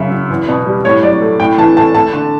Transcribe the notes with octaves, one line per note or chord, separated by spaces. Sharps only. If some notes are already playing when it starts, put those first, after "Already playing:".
Already playing: F#2 C#3 E5
F#3
E2
B2
G3
A2 C#5
F#3 D5
A3
A2 G5
E3 A5
A3 A5
A3 A5
D3